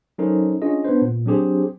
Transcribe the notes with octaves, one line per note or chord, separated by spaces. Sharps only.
F#3 C#4 D#4 A4 A#4 C5
C#4 D4 F4 G#4 D#5
B3 D4 B4 C5
A#2
F#3 C4 D4 G4 G#4 C5